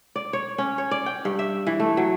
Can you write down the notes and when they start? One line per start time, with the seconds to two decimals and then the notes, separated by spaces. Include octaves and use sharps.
0.16 D5
0.33 C#5
0.58 C#4
0.78 C#5
0.91 D5
1.06 G5
1.25 G2
1.39 E5
1.67 E3
1.80 A3
1.97 F#3